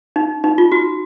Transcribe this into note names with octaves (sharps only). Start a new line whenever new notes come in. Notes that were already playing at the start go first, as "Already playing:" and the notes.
D#4
D#4
F4
F#4